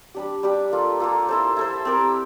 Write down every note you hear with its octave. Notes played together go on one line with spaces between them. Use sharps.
G3 D4 G4
G3 D4 G4
A#3 F4 A4
A#3 F4 A4
E4 A4 C5
E4 A4 C5
C4 G4 A#4